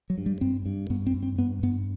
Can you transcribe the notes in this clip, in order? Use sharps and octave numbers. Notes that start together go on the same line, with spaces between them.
F#3
G2
G3
G2 C4
G2
G2 B3
C4
G2
C4
G2 B3
G2 B3